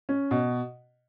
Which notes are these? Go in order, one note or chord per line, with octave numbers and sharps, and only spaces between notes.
C#4
B2